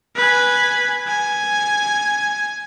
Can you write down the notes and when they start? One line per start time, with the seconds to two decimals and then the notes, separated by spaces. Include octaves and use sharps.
0.16 B4 G#5
1.07 G#5